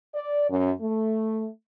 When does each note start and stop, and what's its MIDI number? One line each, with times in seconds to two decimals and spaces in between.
0.15 0.47 74
0.50 0.72 42
0.81 1.48 57